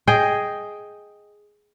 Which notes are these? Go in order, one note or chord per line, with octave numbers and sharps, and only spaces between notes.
G#4 D#5 G5